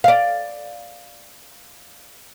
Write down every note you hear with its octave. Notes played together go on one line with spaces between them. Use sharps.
D5 F5